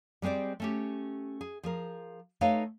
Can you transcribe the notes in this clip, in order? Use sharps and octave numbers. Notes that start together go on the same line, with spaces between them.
G3 G#3 C4 C5 D5
A3 C#4 G4
G#4
F3 G#4 A#4
A3 D#4 B4 C#5 F5